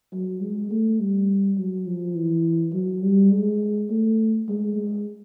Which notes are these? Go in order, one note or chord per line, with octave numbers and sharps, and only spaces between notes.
F#3
G#3
A3
G3
F#3
F3
E3
F#3
G3
G#3
A3
G#3
G#3